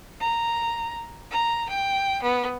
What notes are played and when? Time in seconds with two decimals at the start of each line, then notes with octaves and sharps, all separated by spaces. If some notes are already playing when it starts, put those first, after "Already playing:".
0.19 A#5
1.31 A#5
1.69 G5
2.22 B3